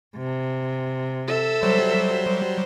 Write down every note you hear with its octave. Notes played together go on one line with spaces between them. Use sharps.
C3
A4 E5
F#3 G3 C5